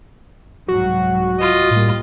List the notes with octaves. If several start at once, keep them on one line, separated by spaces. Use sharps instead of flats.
C2 G#2 F#3 F#4
F4 D#5
A2 G3 A#3